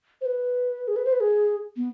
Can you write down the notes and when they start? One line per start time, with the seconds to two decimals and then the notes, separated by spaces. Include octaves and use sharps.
0.21 C5
0.26 B4
0.88 G#4
0.96 B4
1.05 C5
1.12 B4
1.20 G#4
1.76 B3